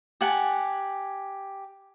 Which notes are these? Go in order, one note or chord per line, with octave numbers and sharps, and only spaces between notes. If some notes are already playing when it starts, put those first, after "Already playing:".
G4 F#5 G#5 A5